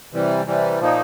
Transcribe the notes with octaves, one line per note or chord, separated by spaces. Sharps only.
C3 E3 G3
C3 E3 G3
A#2 F3 A#3 D#4